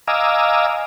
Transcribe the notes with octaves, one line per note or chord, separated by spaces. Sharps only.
D#5 F5 G#5 A#5 D6 E6